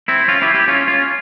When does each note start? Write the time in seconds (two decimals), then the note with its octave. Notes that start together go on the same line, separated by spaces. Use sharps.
0.08 C4 E4
0.28 C#4 F4
0.42 E4 G4
0.54 E4 G4
0.68 C#4 F4
0.88 C#4 F4